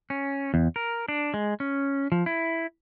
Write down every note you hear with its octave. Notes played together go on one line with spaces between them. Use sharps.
C#4
E2
A#4
D4
G#3
C#4
F3
E4